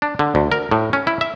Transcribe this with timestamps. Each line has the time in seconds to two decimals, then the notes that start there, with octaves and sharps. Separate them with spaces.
0.02 D4
0.19 D3
0.35 D2
0.52 A#4
0.71 A2
0.93 C#4
1.07 E4
1.21 E5